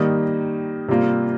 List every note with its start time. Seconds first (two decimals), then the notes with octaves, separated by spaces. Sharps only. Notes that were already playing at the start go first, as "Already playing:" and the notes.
Already playing: D#3 G3 A#3 D#4
0.88 C3 G3 A#3 F4